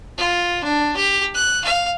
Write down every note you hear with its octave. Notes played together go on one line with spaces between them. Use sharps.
F4
D4
G4
F#6
F5